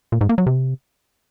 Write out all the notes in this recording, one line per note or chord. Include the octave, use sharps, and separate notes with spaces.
A#2
G#2
A#3
F#3
C3